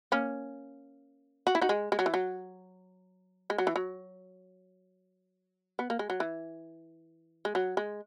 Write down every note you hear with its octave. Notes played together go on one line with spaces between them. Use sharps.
A#3 C#4
F#4
E4
D#4 F#4
G#3
G#3
F#3
E3
F#3
G#3
F#3
E3
F#3
B3
A#3
G#3
F#3
E3
G#3
F#3
G#3